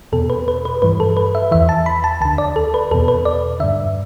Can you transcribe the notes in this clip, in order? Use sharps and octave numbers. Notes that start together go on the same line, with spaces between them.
E2 B2 A4
B4
B4
B4
G2 E3 B4
A4
B4
E5
E2 E3 E5
A5
B5
A5
D2 D3 A5
D5
A4
B4
E2 B2 A4
B4
D5
G2 D3 E5